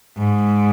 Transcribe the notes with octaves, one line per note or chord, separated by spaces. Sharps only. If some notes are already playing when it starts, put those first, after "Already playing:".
G#2